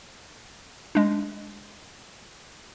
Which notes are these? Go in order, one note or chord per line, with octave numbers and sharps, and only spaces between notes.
G#3 D4